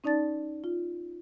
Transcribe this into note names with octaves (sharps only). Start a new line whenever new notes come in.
C#4 D#4 D5 A5 A6
F4